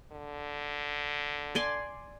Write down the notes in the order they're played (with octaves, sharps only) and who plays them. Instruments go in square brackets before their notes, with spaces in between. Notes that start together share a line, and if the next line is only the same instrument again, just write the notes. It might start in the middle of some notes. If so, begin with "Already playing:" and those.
[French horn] D3
[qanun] D5 G#5 C6